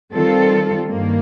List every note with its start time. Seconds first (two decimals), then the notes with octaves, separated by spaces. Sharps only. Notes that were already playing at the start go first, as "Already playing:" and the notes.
0.13 D#3 G3 C4 F4 A4
0.90 G2 D#3 G3 A#3